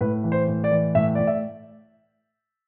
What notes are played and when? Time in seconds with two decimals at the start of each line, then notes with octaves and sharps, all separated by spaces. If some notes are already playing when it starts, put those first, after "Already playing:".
0.01 A2 B4
0.24 E3
0.32 C5
0.48 A2
0.64 D5
0.71 E3
0.95 A2 E5
1.15 A2 D5
1.27 E5